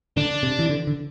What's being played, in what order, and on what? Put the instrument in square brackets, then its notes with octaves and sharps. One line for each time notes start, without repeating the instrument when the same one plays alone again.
[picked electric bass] D3 [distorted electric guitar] D4
[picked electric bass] C3
E3
D3
D3